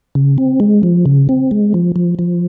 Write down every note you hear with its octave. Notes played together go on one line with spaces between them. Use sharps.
C#3
C4
G#3
F3
C#3
C4
G#3
F3
F3
F3